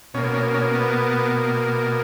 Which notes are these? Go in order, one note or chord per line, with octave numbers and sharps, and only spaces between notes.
B2 A#3 C#4
C#4
C#4
B3